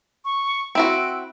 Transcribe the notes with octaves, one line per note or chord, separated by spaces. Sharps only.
C#6
C4 E4 F#4 D7